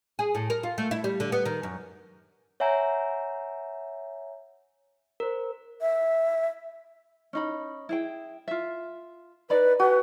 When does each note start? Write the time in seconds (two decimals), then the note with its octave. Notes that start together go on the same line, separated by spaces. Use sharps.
0.19 G#4
0.35 A2
0.50 A#4
0.63 F4
0.78 A3
0.91 E4
1.04 G3
1.20 D3
1.32 B3
1.46 D#3
1.63 F#2
2.60 C#5 E5 F#5 G#5 A#5 G6
5.20 A#4 C5
5.81 E5
7.33 C#4 D#4 B5
7.89 E4 G#4 G5
8.48 F4 E5
9.50 D#4 B4 D5 B5
9.80 F#4 G4 B4 G#5